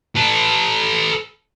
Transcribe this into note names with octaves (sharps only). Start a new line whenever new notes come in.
A4 B4